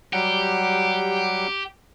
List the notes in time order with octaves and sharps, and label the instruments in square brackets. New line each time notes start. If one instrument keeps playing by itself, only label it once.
[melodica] F#3 G3 F#5 [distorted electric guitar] G4